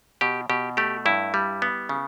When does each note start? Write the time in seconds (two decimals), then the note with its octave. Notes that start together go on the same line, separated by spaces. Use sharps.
0.21 B2 G4
0.50 B2 G4
0.77 A3 G4
1.06 G2 E4
1.34 G3
1.62 B3
1.89 C#3